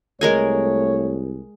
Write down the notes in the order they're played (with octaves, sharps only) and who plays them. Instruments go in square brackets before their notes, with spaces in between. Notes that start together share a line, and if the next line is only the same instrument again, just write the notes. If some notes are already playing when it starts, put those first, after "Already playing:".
[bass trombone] C2 [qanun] G#3 A#4 G#5 [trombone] A3 [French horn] C#5